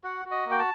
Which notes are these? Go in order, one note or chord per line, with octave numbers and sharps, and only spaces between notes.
F#4 F#5
F#4
D#5
A#3 G5
A5